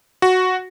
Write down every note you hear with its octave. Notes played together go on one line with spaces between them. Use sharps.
F#4